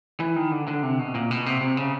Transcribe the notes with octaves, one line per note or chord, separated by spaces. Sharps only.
E3
D#3
D3
D3
C3
B2
A#2
B2
C3
C3
C#3